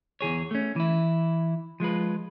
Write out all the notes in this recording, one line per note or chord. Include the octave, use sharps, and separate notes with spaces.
E2 E3 G#4 C#5
A3 C#4
E3 E4
F3 G#3 F4 B4